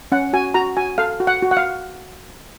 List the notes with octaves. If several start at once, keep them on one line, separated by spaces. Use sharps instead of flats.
C#4 F#5
F#4 G#5
F#4 A#5
F#4 G#5
A4 F5
F#4
F#5
F#4
F#5
F5